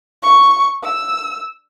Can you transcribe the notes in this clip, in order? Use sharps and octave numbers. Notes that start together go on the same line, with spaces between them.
C#6
E6